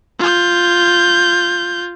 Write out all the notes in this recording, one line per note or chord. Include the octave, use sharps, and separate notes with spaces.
F4 G6